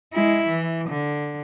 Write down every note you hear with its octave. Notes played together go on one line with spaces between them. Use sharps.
G#3 E4
E3
D3